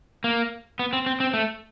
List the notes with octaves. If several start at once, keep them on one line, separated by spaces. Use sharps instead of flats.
A#3
B3
C4
C4
C4
A3